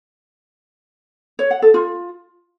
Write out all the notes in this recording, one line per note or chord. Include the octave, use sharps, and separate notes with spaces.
C#5
F#5
A4
F4